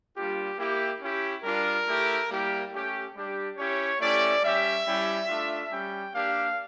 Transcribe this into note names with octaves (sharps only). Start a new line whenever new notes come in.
G3 A#3 D4 F4 G4
A#3 E4 G4
C#4 E4 G4
G3 D4 F4 A#4
A3 E4 G4
G3 A#3 E4 G4
A3 C#4 G4
G3 D4 G4
C#4 E4 G4 C#5
A3 C#4 E4 G4 D5
G3 C#4 G4 E5
G3 C#4 E4 G4
A3 D4 F4
G3 C#4 G4 G5
A#3 D4 G4 F5